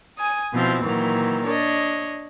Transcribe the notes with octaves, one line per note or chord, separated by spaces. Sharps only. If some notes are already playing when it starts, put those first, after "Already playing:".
G#5 D#6
B2 F3 C4 E4
A#2 D#3 E3 F#3
D4 C#5 D#5